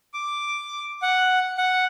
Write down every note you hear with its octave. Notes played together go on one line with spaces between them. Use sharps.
D6
F#5
F#5